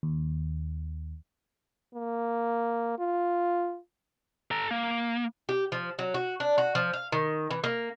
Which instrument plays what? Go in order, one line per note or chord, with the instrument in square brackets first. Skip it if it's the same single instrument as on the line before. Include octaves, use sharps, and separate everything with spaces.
[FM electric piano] D#2
[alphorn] A#3
F4
[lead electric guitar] A4 A#5
A#3
[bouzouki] G4
F3
F#3
F#4
D4
F#4
F3
F5
D#3
E3
A#3